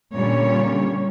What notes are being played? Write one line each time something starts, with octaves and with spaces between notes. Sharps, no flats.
A#2 D3 G3 C#4 C#5